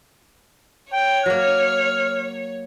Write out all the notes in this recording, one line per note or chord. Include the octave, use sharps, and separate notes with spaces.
C#5 G5
F#3 A#3 F6